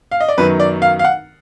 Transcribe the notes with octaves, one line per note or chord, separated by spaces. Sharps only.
F5
D#5
D5
F#2 D#3 F#3 B3 B4
D5
F5
F5
F#5